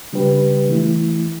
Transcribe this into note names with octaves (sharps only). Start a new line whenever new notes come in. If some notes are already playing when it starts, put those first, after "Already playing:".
C#3 G3 D4 G4 B4
E3 A3 E4